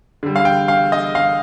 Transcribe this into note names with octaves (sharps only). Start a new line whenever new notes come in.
D3 G3
F5
G5
F5
D#5
F5